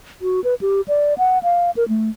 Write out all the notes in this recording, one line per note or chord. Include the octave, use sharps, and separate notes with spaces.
F#4
B4
G4
D5
F#5
F5
A#4
A3